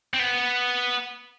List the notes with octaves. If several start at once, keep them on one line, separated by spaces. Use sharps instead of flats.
C4
B3